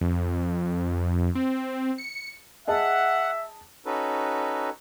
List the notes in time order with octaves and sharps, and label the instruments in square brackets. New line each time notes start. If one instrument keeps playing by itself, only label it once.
[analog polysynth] F2
C4
C#7
[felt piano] G#4 D#5 A5 [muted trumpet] E5 [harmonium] F#5
[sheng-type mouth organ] C#4 D#4 F#4 A4 B4